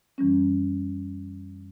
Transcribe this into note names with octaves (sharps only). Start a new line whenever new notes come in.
F#2 E3 G3 C#4